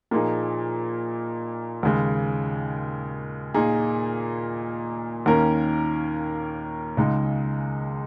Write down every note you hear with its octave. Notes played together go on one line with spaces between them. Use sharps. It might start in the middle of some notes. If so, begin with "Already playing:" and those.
A#2 F3 A#3 D#4 G#4
D#2 C#3 G#3
A#2 A#3 D#4 G#4
D#2 D#3 A#3 C#4 A#4
C#2 C#3 G#3 D#4